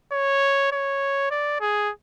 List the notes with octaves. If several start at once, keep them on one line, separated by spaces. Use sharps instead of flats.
C#5
C#5
D5
G#4